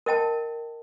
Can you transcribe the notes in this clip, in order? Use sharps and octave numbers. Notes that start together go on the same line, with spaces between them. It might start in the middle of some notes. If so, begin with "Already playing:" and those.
A#4 D#5 G5 A5